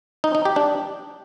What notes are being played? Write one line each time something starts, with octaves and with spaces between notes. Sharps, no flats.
D#4
D#4
G4
D4